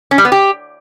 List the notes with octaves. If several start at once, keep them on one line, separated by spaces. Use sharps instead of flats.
C#4
G3
B3
G4